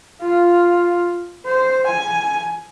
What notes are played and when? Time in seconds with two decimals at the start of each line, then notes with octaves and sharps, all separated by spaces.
0.21 F4
1.46 C5
1.86 G#5